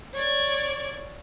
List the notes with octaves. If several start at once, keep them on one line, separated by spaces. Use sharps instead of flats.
C#5 D5